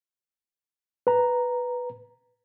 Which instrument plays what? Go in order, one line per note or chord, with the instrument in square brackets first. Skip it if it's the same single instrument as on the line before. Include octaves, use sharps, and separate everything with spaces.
[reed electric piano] B4 A#5